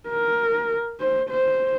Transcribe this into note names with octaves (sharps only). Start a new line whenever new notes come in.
A#4
C5
C5